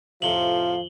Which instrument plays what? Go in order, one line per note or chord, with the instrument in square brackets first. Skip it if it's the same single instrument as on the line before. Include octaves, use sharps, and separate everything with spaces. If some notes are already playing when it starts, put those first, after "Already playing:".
[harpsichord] F2 A2 C3 [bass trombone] F3 [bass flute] F5 [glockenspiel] F#7 G7